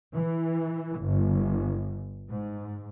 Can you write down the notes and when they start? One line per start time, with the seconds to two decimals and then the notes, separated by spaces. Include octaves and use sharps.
0.14 E3
1.00 G1
2.29 G#2